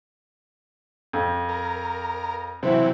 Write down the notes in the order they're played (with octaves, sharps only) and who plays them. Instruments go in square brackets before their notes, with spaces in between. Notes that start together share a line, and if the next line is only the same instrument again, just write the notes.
[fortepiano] F2
[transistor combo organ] A#4
[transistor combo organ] C3 E3 F#3 [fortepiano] C4 E4